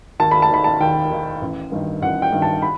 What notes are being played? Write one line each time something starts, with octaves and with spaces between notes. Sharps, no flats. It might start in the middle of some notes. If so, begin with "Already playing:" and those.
D#2 A5
B5
A5
D#3 B5
A5
D#2 G5
D#3
A1
G2 D#3
A1 F#5
G5
G2 D#3
A5
B5